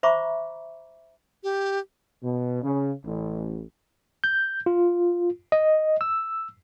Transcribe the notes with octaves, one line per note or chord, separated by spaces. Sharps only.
C5 E5 A#5 B5 C#6 D6
G4
B2
C#3
A1
G6
F4
D#5
E6